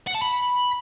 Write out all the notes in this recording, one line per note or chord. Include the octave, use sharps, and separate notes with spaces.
F#5
A5
B5